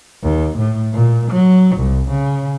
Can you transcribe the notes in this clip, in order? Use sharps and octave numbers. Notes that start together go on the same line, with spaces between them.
D#2
A2
A#2
F#3
C2
C#3